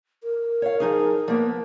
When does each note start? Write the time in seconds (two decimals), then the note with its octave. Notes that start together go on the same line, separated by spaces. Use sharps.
0.23 A#4
0.62 C#5 F5
0.80 F3 D#4 G#4
1.28 F3 A#3 B3